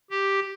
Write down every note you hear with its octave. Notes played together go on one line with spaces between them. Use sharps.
G4